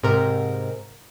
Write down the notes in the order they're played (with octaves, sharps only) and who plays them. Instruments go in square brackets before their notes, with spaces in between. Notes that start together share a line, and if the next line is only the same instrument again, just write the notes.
[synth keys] G#2 C3 A#4